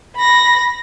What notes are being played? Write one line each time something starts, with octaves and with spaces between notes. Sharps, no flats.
B5 A#6